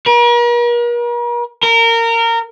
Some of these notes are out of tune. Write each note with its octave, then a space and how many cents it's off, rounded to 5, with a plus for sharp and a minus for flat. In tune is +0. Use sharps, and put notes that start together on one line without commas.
A#4 +45
A#4 -20